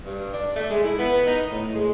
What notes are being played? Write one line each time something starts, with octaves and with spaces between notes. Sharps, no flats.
G2
D4
A3
G#3
E4
B3
D#4
A2
G#3